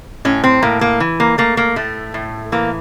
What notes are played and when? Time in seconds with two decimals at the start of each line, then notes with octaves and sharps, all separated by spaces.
0.25 A2 C#4
0.44 C4
0.63 A2 A#3
0.81 A#3
1.00 E3
1.20 A#3
1.38 A3 A#3
1.57 A#3
1.76 A2 A3
2.14 A2
2.52 E3 A#3